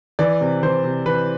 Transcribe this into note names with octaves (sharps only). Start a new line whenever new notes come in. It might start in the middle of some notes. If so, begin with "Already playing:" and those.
E3 D5
C3
E3 C5
C3
E3 B4